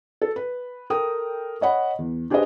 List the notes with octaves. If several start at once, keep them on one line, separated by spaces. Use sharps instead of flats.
A4
B4
A4 A#4 G5 D#6
C#5 D#5 F#5 B5
E2
D4 G4 G#4 B4 C5 D#5